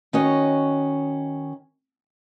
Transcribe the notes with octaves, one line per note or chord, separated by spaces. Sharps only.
D#3 C#4 F#4 C#5 D#5